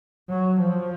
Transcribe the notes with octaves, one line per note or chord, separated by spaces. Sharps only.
F#3
F3